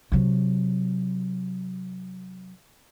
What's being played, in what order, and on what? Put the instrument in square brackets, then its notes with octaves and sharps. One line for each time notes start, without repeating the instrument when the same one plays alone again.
[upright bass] C3 F#3